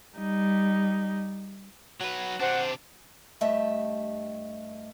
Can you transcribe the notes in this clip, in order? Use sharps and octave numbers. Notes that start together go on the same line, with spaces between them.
G3 D#4
F#3 F#4 B4
C3 D4 C5 F#5
G2 A3 G4 D#5 E5 A5